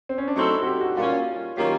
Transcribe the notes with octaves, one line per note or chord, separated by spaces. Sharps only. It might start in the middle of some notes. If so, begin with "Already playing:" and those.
C4
C#4
D4
F#3 A3 C4 D#4 E4 A4
F#4
G4
F#4
A#2 G3 A#3 C#4 F4
D#3 F#3 A#3 C#4 F4 G4